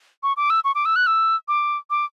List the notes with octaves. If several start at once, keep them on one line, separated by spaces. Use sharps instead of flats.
C#6
D6
E6
C#6
D6
E6
F#6
E6
D6
D6